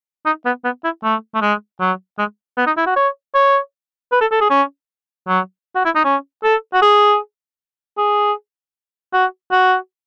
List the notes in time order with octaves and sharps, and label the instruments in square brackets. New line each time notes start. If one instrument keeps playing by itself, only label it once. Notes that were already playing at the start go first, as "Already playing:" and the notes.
[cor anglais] D#4
B3
B3
E4
A3
A3
G#3
F#3
G#3
B3
D#4
E4
F#4
C#5
C#5
B4
A4
A4
G#4
C#4
F#3
F#4
E4
D#4
C#4
A4
F#4
G#4
G#4
F#4
F#4